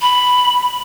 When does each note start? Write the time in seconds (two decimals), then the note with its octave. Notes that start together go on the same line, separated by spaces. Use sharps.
0.02 B5